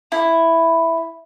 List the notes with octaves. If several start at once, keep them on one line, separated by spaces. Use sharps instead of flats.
E4